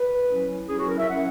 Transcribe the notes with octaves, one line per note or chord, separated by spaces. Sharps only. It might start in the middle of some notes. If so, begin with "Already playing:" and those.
Already playing: B4
F#3 C#4 E4
F#3 C#4 E4 G#4
F#4
A#4
E5
F#3 C#4 E4 F#5